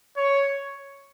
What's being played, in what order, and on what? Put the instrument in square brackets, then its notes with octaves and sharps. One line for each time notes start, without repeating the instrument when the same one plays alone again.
[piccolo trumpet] C#5